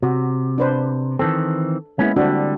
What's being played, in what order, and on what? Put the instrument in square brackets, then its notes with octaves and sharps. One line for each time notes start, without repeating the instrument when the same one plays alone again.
[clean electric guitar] C3 [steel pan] F#4
[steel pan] D4 B4 C5
[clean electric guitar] D#3 E3 C4 [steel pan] A4
[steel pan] G#3 A#3 E4 [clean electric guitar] B3 C#4
[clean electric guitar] D3 G3 [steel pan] C4 D4 F#4